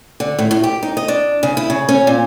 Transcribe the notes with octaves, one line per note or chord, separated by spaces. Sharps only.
D3
A2
A2
G4
D#4
D#5
D4
C#3
E4
C#3
C#4
A#2